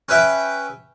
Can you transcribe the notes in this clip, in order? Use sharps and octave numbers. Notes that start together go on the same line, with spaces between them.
C#4 B4 E5 G5